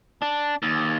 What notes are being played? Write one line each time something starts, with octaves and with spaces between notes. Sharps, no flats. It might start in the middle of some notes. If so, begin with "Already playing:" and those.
D4
D#2